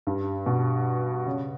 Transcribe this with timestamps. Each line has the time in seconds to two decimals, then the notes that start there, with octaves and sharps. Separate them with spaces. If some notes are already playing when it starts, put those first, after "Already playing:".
0.07 G2
0.46 B2
1.26 C#3